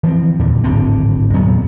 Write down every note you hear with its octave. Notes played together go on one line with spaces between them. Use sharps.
E3 F3 C4
D#2 A#2 D3
D1 G#1 D3 C4
E2 A#2 F#3 B3